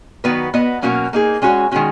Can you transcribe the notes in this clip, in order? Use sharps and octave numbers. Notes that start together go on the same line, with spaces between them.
D#3 F#3 B3 F#4 B4
B3 F#4 B4 D#5
B2 F#3 A#3 C#4 F#4
A#3 D#4 G#4
G#3 C#4 F#4 C#5
D#3 G#3 C#4 F#4